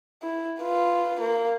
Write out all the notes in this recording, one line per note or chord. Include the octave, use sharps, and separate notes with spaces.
E4
F4 B4
A#3